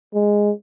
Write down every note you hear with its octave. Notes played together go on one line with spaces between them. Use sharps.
G#3